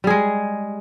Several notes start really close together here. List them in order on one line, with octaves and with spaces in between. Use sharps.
G3 G#4 G#3